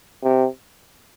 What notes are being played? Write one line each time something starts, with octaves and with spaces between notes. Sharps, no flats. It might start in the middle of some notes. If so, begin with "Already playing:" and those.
C3